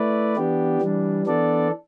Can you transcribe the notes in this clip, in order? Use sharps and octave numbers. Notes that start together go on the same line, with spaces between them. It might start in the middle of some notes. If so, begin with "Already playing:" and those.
Already playing: A3 E4 B4 D5
E3 B3 D4 G4
E3 G3 D4
E3 B3 D4 A4 D5